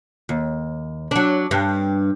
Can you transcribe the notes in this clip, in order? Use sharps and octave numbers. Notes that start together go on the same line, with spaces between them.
D#2
F#3 D4
G2